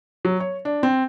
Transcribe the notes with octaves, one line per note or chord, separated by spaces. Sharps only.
F#3
C#5
D4
C4